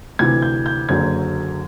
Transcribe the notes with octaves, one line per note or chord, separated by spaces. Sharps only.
D2 C3 E3 G#6
G6
G6
F#1 F#2 D3 F#3 G#6